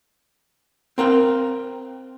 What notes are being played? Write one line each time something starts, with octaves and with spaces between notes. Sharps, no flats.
C4 A#4 F5 G5